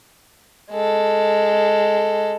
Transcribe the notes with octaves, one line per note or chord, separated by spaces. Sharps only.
G#3 A4